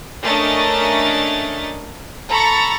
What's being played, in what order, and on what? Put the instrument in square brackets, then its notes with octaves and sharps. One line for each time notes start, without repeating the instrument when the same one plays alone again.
[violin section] A3 C#4 D4 A#4 D#5 A6
A4 A#5 B5 C#6 A6